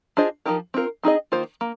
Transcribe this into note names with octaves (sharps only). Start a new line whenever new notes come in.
D4 F4 G#4 C5 D#5
F3 G#3 D#4 G4 A#4
C4 F4 A#4
C4 D#4 G#4 D#5
D#3 A#3 F4 C5
A#3